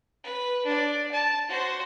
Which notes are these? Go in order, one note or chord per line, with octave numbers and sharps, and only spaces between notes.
B4
D4 D5
A5
F#4 C5